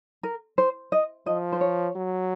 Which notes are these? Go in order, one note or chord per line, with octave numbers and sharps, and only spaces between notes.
A#4
C5
D#5
F3 D#5
C5
C#5
F#3